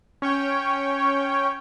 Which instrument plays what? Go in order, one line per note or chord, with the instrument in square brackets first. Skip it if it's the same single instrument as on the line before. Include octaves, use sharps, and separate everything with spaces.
[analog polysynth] C#4 C#5 G5